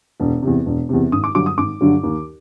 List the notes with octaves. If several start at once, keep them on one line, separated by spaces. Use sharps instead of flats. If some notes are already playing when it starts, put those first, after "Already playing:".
E1
E2 C3
E1
E2 C3
G#1 D#6
D6
G2 D3 F#3 D6
D#6
G#1 D6
G2 D3 F#3
D#2